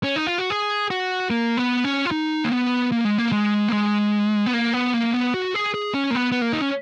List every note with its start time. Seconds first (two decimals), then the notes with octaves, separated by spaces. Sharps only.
0.04 C#4
0.16 D#4
0.27 F4
0.38 F#4
0.50 G#4
0.90 F#4
1.30 A#3
1.57 B3
1.84 C#4
2.05 F4
2.11 D#4
2.44 A#3
2.52 B3
2.92 A#3
3.05 G#3
3.18 A#3
3.32 G#3
3.68 A#3
3.73 G#3
4.46 B3
4.53 A#3
4.73 B3
4.94 A#3
5.13 B3
5.34 F#4
5.54 G#4
5.74 G#4
5.94 C#4
6.11 A#3
6.15 B3
6.32 B3
6.42 A#3
6.53 D#4
6.61 C#4